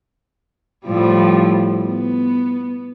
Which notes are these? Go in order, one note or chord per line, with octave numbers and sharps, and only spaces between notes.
A2 F3 G3
B3